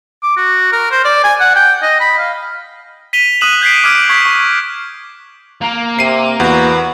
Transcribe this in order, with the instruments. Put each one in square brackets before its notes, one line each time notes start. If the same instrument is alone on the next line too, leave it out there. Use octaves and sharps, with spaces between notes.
[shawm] D6
F#4
A#4
C5
D5
G#5
F#5
G5
D#5
B5
F5
[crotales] B6 D#7 F7 G7
D#6 F#6 D#7 E7 F#7
G6 G#6 B6 C7 D7
D6 D#6 F6 G#6 D7
C#6 G#6 B6
C#6
[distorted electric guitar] A#3
[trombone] C3 [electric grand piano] C7 D#7
[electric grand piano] E2 [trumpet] F#4 [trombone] B4